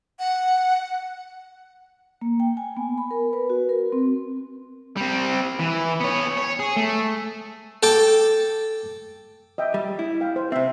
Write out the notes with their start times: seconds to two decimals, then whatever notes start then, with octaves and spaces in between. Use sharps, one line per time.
0.19 F#5
2.21 A#3
2.40 G5
2.57 G#5
2.77 B3
2.98 B5
3.11 A#4
3.33 B4
3.50 F#4
3.69 A#4
3.92 C4
4.97 G3 C4
5.60 E3
6.01 B3 C#5
6.37 C#5
6.60 G#4
6.76 A3
7.83 A4 G5 D6
9.58 D#5 E5 G5
9.74 G3
9.99 E4
10.21 F5 G5
10.36 C5
10.52 C3 C4 E5